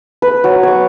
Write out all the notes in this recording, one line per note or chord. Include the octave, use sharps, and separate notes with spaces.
B4
F#3
C#5 D6